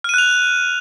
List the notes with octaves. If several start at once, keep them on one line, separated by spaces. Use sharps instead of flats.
F6 F#6 D#7 F7